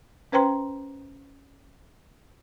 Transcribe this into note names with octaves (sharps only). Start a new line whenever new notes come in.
C#4 B4 C5 G5 A#5 C6